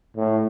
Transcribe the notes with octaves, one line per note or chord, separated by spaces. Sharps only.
A2